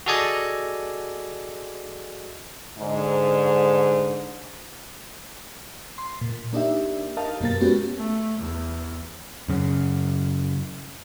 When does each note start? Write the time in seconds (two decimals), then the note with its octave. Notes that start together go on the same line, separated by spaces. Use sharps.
0.06 F#4 G#4 A4 D5 D#5 G#5
2.77 G#2 D3
5.98 C6
6.21 A#2
6.53 A#3 D4 D#4 G4 E5
7.17 G4 A#4 D#5 F5 A5
7.41 F#2 B2 A#3 A#4 A6
7.60 G#3 A#3 B3 C#4 F#4 G4
7.96 A3
8.39 E2
9.48 F#2 C#3